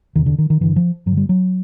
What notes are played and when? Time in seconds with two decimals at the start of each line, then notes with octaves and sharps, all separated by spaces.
0.16 E2 C3 D#3
0.26 D3
0.39 D#3
0.50 D#3
0.61 G2 D3 E3
0.76 F3
1.06 G2 D3 F#3
1.17 G3
1.29 F#3